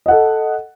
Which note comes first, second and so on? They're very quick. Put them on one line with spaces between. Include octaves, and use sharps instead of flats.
D#5 F#5 A4